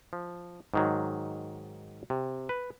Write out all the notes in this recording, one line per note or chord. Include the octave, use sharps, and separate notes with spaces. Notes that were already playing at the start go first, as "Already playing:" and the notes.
F3
G#2 D#3 F#3
C3
B4